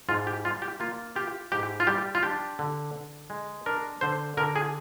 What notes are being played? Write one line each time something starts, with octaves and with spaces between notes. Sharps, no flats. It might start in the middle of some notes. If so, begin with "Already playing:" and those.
G#2 F4
G4
G3 F4
G4
A#3 F4
F4 G4
G#2 G4
F4
G3 G4
F4
D4 G4
D3
D3
G#3
D4 A#4
D3 C5
D3 A#4
G#4